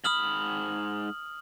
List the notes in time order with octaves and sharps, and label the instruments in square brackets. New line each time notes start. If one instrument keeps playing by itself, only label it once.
[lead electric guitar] G#2 B5 [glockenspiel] D#6 F6 F#7